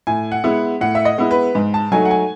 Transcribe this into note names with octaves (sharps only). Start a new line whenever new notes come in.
A2 G#5
F#5
G#3 B3 E4
A2 F#5
E5
D#5
G#3 B3 E4
B4
G#2
A5
F#3 A3 D#4 G#5
F#5
G#5